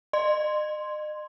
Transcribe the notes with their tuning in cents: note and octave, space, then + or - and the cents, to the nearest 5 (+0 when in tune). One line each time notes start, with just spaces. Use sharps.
D#5 -45 C6 +0